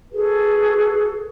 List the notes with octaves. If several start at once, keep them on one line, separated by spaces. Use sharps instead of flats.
F#4 G#4 A4 B4